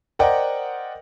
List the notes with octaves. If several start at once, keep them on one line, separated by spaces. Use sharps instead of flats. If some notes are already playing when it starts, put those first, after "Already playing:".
A#4 C5 D5 D#5 F#5 G5